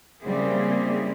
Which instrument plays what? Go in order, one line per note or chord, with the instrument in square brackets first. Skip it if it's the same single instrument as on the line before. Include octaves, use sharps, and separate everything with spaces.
[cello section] C#3 G3 A#3 C4 E4 G#4